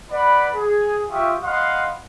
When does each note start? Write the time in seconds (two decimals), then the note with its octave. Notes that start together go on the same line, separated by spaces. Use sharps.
0.11 B4 D5 F#5 B5
0.55 G#4
1.10 F4 G4 E5 G5 C#6 D#6
1.43 D#5 F5 F#5 B5 C6 D#6